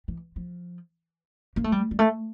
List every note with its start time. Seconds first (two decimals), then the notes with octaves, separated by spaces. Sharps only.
0.08 E3
0.36 F3
1.56 A#3
1.64 A3
1.72 G3
1.91 G3
1.99 A3